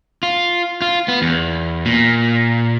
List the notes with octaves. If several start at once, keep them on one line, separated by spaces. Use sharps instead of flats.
F4
F4
B3
E2
A#2